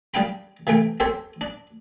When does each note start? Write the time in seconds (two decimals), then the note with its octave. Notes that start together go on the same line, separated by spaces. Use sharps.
0.14 G3 D4 F5 G5 B5
0.67 C3 E3 A3 G5
1.00 C4 G4 A4 C5 C#5
1.41 D4